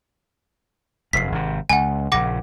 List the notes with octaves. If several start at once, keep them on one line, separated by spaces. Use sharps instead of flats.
F1 F#2 B6 C7
G#1 C3
C#2 F#5 G#5
A#1 C#3 F#5 D6 A#6